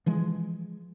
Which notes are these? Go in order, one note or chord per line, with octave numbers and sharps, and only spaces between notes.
E3 F3 G#3